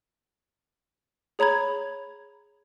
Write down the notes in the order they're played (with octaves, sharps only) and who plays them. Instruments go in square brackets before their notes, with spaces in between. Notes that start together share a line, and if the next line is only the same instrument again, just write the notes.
[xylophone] G#4 C#5 A#5 B5 G#6